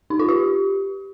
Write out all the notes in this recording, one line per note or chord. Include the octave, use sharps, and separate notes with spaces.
D#4
F4
G4